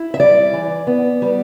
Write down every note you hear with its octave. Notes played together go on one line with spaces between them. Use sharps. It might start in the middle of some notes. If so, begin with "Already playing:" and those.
Already playing: E4
E5
G3 D5
E3
B3
G3